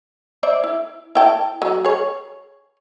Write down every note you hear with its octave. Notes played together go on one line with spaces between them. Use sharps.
C5 D5 E5
E4
E4 G5 A5
F#3
G#4 C#5